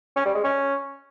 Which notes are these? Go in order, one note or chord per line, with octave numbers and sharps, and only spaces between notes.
C#4
G3
G#3
C#4